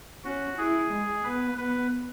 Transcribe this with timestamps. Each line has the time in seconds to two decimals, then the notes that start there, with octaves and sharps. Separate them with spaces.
0.24 C#4 F#4
0.58 E4 G#4
0.91 G#3
1.24 B3 B4
1.58 B3 B4